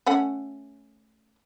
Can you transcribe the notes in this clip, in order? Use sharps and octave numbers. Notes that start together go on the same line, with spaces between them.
A3 C#4 F#5